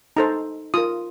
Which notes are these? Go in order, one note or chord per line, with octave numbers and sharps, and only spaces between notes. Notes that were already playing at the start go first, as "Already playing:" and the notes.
D#4 A4 C5 A#5
F4 A#4 D#6